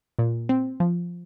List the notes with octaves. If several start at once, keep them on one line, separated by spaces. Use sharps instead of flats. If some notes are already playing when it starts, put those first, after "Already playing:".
A#2
C4
F3